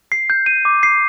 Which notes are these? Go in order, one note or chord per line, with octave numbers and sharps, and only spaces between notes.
C7
G6
D#7
D6
C7